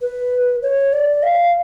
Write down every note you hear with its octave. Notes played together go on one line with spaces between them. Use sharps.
B4
C#5
D5
F5